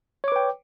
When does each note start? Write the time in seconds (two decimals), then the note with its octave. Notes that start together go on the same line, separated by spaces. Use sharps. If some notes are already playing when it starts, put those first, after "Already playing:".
0.24 C#5
0.28 D6
0.32 B4
0.36 G5